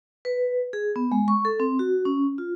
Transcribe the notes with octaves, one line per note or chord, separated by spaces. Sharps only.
B4
G#4
B3
G#3
C#6
A4
C4
F#4
C#4
F4